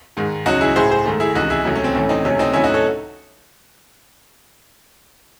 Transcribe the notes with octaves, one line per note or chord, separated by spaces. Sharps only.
G#2 D#3 G#3
C#2 C#3 F#3 D#4 F#4
E4 G#4
A2 G#3 G#4 C5
G#4 C5
G#2 D#3 A3
E4 G#4
C#2 C3 E3 D#4 F#4
E4 G#4
C#2 C3 F#3 A3
C#4
C4
A2 E3 A3 C#4
C4 D#4
C#2 C3 F#3 A3 C#4
C4 D#4
A2 F#3 A3 C#4 E4
D#4 F#4
A4 C#5